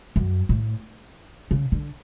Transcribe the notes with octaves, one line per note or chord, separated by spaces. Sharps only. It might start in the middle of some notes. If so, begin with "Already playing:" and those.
F#2
A2
C#3
D3